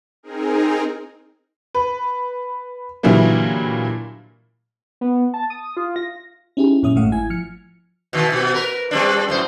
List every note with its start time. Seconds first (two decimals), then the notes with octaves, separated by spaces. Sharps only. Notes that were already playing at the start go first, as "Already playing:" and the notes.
0.23 C4 D#4 G#4 A#4
1.75 B4
3.03 A#2 D3 E3 F#3 G3 A#3
5.01 B3
5.34 A5
5.50 D#6
5.77 F4
5.96 A#6
6.57 C#4 D#4 E4 G4 G#4
6.83 F#2 A#2 C#4 E5 D#6
6.96 A1 A2 G#3 A3 F5 F#5
7.12 G#1 E4 G#5 G#6
7.30 F3 F6 C#7
8.13 B2 D#3
8.32 B2
8.54 A#4 B4
8.91 G3 C4 D4
9.29 F#2 A2 C5